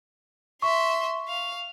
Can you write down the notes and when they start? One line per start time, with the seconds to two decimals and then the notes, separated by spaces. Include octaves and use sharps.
0.62 E5 C6 C#6
1.28 F5